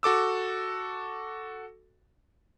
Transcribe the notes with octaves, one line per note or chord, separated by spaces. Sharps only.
F#4 A4 D6 E6